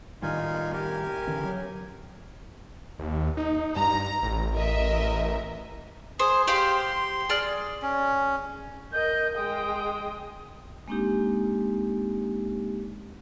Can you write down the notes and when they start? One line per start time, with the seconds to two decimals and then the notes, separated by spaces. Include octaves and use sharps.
0.22 A2 D#3 G3 D#4 F4 G#5
0.73 G4 A#4 G#5
1.27 D3 E3 C#4
1.44 F#3
2.99 D#2
3.37 D#4
3.76 G2 A#5
4.23 A1
4.54 A#4 D#5 E5
6.19 G#4 C5
6.47 G4 C5 F5 C6
7.30 G#4 D5 F6
7.82 C#4
8.93 A#4 D#5 G6
9.36 G#3 G5 D#6
10.88 G#3 A#3 C4 D4 D#4 G4